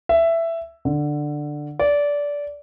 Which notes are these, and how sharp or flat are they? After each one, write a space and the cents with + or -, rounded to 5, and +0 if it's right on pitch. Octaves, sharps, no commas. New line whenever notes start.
E5 +10
D3 +10
D5 -20